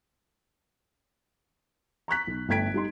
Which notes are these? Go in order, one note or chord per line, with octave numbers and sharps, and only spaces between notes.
A#5 C#6 F#6 B6
B1
G1 A3 G5 G#6 B6 D7
G3 D#4 C6